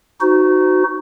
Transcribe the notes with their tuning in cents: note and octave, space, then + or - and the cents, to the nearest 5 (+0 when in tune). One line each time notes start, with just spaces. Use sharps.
D#4 +0 F#4 +0 C5 -35